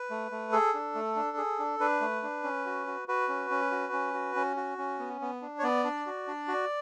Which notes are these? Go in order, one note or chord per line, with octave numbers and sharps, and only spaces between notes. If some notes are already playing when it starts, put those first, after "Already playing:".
Already playing: B4
A3
A3
G#4 A4
D4
A3
D4
G#4
D4
D4 B4
A3
D4
C#4
F#4
F#4
F#4 B4
C#4
C#4
F#4
C#4
F#4
C#4
F#4
C#4
B3
B3
D4
C#5
B3 D5
D4
F#4
D4
F#4